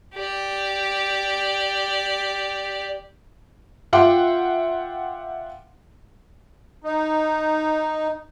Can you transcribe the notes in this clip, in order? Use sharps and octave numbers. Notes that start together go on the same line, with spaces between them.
G4 D5
F4 E5 F#5 G5 C6 D6
D#4